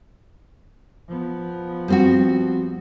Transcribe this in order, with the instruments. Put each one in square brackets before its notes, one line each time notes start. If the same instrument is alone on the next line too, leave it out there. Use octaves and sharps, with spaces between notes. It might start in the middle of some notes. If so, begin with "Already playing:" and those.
[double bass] F3 B3
[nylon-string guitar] G3 C4 F#4